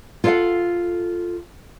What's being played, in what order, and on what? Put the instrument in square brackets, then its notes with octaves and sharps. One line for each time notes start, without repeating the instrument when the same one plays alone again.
[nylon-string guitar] F4 A4 C#5 D5 F5 F#5